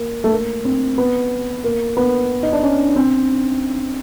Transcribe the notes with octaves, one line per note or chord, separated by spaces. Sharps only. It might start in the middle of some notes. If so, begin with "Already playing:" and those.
Already playing: A#3
A3
A#3
C4
B3
A#3
B3
D#4
D4
C#4
C4